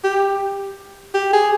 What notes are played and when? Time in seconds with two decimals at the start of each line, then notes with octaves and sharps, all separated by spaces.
0.04 G4
1.14 G4
1.33 G#4